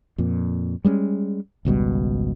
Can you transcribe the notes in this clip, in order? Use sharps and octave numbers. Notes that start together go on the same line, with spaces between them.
F2 A#2
G3 G#3 A#3 C#4
G#1 C#2 B2 G3